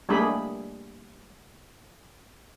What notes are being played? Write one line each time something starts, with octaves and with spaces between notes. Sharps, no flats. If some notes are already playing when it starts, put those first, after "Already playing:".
G3 A3 A#3 D4 G#4 B5